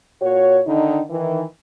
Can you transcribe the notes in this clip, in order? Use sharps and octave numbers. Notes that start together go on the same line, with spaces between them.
A#2 F#4 C#5
D3 D#3 D4 D#4
D#3 E3